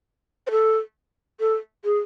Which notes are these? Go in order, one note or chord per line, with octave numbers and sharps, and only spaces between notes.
C5
A4
A4
G#4